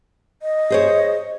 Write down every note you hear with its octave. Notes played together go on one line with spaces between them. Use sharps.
D#5
G#4 C5 C#5